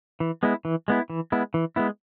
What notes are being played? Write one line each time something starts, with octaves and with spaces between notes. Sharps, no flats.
E3
G#3 B3 E4
E3
G#3 B3 E4
E3
G#3 B3 E4
E3
G#3 B3 E4